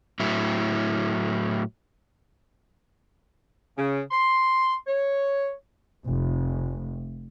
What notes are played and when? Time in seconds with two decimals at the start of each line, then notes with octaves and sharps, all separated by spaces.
0.20 A2 F#3 E4
3.78 C#3
4.11 C6
4.87 C#5
6.08 F1